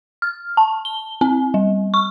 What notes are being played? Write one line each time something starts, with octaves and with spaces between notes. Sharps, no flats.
F6
A5
G7
C4
G3
C#6